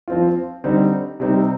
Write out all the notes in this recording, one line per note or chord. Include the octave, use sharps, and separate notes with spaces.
F3 C4 F4
D3 G3 C4 D#4
C3 G3 C4 D#4